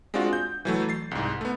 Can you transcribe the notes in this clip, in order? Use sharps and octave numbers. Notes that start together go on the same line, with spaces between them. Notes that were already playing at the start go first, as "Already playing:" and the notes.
G#3 C4 D4 F4 F#4
G6
E3 F#3 A3
A6 C7
C2 G#2
A3 B3